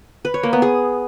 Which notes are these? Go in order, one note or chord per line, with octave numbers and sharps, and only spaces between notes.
B4
C#5
A#3
B3
G#4